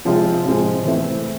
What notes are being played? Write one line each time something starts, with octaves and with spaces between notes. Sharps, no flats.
C3 F3 G#3 C4 F4
C3 F3 G#3 C4 F4
E3 A3 C4 E4